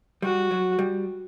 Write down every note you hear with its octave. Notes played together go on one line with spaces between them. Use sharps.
G3 F#4
F#3
G3